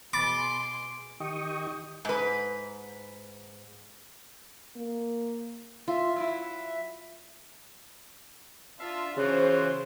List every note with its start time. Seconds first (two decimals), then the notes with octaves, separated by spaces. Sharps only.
0.13 B2 G#4 B5 C6 D6 A6
1.20 D#3 G4 D#5 G5 C#6 D#6
2.05 G#2 B4
4.76 A#3
5.88 F4 E5
6.16 F#3 E4 E5
8.79 D4 F4 E5 F5
9.17 C#3 E3 F4 F#4 C5